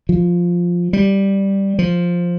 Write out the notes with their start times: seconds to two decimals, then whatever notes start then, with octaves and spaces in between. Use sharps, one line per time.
0.09 F3
0.93 G3
1.79 F3